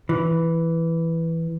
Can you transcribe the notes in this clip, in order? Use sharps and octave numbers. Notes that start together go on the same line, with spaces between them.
E3